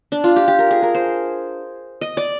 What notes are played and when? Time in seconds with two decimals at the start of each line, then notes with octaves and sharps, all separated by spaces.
0.12 D4
0.24 F4
0.36 G4
0.48 G4
0.59 A#4
0.71 G#4
0.82 A#4
0.94 C5
2.01 D#5
2.17 D5